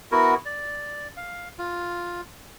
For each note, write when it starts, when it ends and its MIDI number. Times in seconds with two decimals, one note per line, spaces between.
0.12 0.35 59
0.12 0.35 64
0.12 0.35 66
0.12 0.35 70
0.46 1.08 74
1.17 1.48 77
1.59 2.21 65